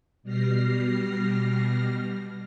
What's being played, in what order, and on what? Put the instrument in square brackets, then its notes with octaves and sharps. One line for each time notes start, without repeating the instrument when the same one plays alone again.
[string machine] B2 G3 F6 A#6 C7